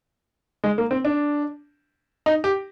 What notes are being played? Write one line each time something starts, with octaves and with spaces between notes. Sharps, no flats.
G#3
A#3
C4
D4
D#4
G4